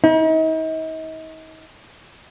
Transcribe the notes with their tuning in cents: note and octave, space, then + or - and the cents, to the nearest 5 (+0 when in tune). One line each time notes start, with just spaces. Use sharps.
D#4 +40